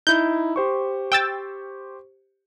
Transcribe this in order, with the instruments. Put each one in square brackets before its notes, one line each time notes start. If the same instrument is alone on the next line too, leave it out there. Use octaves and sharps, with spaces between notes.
[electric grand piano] D#4 E4 [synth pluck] G6
[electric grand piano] G4 C5 C#6
[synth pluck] G5 E6 A6